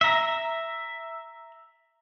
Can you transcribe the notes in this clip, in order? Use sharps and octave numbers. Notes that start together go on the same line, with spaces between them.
E5 A#5